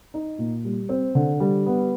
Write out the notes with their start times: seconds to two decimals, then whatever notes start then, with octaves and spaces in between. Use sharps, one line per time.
0.14 D#4
0.38 A#2
0.64 G3
0.89 C4
1.15 D3
1.40 G3
1.66 B3